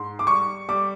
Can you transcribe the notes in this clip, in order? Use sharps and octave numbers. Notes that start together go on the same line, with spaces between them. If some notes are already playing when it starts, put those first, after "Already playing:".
Already playing: G#2 C6
D6
G3 C#6
G3 D6